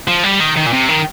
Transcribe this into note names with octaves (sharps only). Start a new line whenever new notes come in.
F3
G3
D#3
D#3
A#2
C3
D#3